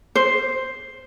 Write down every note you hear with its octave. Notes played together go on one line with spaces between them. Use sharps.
C5